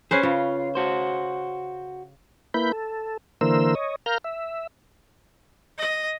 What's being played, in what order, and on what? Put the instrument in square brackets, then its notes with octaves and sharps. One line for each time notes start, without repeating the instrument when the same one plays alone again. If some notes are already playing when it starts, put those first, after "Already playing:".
[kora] C#4 B4 C5 [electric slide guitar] G#4
[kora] C#3 [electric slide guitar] F4
[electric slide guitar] F#4 C5
[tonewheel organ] A#3 E4 B4 B5 G6
A4
D3 E3 A#3 A#4 C5 E6
C#5 D#5
A#4 F5 A#5 F6 G6
E5
[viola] D#5